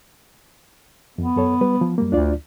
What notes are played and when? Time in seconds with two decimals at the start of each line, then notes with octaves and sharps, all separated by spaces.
1.18 F2 B3
1.36 F#2 A4 C#5
1.61 G3 B4
1.81 F3
1.98 F#2 G3 A#3
2.12 D2 D4 F4 D5